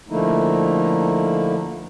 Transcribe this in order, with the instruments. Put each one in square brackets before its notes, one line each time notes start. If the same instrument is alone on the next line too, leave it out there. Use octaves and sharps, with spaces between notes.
[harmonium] D3 F3 A3 A#3 D#4 E4